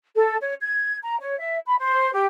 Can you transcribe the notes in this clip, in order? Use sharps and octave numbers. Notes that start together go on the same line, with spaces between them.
A4
C#5
G#6
A#5
C#5
E5
B5
C5
G4